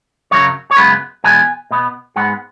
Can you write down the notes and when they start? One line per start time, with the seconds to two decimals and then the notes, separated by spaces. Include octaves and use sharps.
0.31 F#2 C#3 F#3 C#5
0.71 C#5
0.77 F#2 C#3 G#3 B3 B4
1.24 E2 B2 G#3 B3 G#5
1.71 B2 B3
2.16 G#2 G#3 B3 F#5